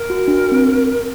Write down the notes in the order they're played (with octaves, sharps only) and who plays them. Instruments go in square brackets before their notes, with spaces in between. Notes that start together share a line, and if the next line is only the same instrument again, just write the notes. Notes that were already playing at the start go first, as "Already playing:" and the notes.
Already playing: [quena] A#4
[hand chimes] F#4
D4
C4